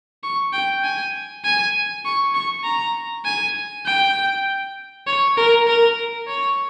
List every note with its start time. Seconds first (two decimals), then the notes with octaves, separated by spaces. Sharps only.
0.23 C#6
0.53 G5
0.83 G#5
1.44 G#5
2.05 C#6
2.34 C#6
2.64 A#5
3.25 G#5
3.86 G5
5.07 C#5
5.37 A#4
5.67 A#4
6.27 C#5